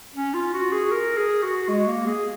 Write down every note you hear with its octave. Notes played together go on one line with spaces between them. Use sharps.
C#4
F4
F#4
G#4
A#4
G#4
F#4
G#3
A#3
G#4